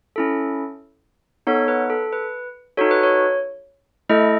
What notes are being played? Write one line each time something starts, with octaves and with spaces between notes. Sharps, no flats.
C#4 E4 A4
B3 D#4 A4 C#5
B4
A4
B4
D#4 F#4 A4 C#5
B4
C#5
A3 E4 A4 D#5